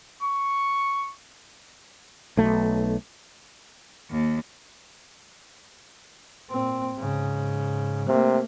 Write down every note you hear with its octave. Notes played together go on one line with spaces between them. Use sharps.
C#6
B1 A3
D#2
A#2 C4
G#2 C#3
C3 A3 A#3